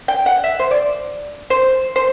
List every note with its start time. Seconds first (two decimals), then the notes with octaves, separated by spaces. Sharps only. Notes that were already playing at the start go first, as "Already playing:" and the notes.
0.08 G5
0.26 F#5
0.44 E5
0.59 C5
0.71 D5
1.50 C5
1.96 C5